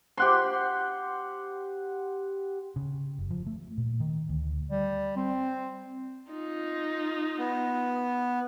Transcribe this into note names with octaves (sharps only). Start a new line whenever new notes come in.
G4 F#5 C6
C#3
F#1
F3
A3
A#2
D#3
D2
G3
C4
D#4 F4
B3